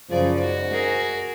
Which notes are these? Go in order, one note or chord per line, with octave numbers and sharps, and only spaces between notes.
F#2 C#3 F3 G#4 D5
G#2 F#4
G#4 A#4